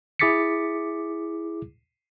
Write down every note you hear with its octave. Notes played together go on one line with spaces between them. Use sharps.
E4 G#4 D6 A6 B6 C#7